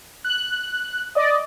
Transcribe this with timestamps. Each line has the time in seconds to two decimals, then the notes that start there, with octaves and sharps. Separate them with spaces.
0.24 F#6
1.15 D5 D#5